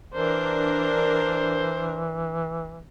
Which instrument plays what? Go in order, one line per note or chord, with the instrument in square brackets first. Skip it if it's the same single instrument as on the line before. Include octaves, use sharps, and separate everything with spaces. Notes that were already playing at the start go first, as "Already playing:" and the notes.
[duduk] E3 [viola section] D4 A#4 [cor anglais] C5